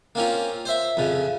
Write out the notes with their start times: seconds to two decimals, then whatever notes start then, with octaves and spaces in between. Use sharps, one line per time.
0.15 A#3 C4 C#4 F4
0.65 C5 E5
0.97 F2 C#3